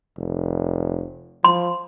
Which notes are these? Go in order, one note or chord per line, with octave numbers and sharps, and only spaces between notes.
F1
F3 C6